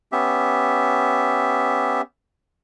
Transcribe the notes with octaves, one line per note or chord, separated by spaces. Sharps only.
B3 C#4 G4 E5